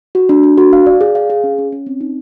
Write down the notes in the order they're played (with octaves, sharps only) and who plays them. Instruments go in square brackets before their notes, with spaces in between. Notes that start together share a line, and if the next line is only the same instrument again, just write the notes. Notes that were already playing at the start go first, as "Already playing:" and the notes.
[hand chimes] F#4
D4
D4
F#4
F5
D5
G#4
F5
G#4
C#4
C#4
C#4
C4
D#4